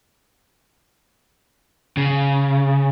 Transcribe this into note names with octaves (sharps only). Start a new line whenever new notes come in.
C#3